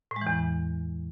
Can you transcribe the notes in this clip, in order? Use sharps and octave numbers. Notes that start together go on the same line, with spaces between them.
A2
G#3
E3
E2